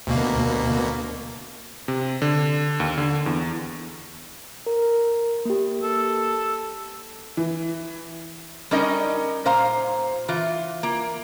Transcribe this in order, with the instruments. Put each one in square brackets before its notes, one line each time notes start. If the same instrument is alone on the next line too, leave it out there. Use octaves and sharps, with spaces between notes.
[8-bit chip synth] D2 B2 A#3
[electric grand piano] C3
D3
D#2
D3
E2
[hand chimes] A#4
A#3 G4
[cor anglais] A4
[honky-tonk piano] E3
[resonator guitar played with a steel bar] G3 C#4 D#4 A#4 D#5
A#2 C5 F5 A#5
E3 F4
A#3